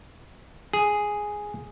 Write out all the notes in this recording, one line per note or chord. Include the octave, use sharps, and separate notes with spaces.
G#4